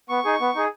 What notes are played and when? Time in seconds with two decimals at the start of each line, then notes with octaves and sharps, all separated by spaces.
0.09 B3 C#6
0.25 D#4 G#4
0.40 B3
0.55 D#4 G#4